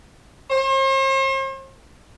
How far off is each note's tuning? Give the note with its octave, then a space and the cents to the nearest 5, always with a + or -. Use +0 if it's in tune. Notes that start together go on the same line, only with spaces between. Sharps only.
C5 +45